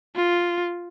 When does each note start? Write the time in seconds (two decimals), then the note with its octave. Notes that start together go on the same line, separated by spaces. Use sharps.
0.15 F4